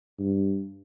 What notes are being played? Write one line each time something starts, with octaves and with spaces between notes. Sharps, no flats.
G2